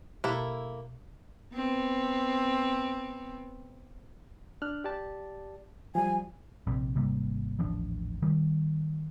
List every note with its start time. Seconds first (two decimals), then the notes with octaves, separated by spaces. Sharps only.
0.24 B2 A#3 E4 G4 A4
1.54 B3 C4
4.62 D4 F6 F#6
4.84 G4 D5 A5
5.95 F3 G3 G#5
6.67 A#1 C3
6.95 G#1 C3 G3 A#3
7.59 D#1 A1 F3 D4
8.22 D#3 G3